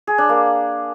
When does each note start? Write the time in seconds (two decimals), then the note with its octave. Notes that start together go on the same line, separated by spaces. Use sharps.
0.07 G#4
0.18 D4
0.29 A#3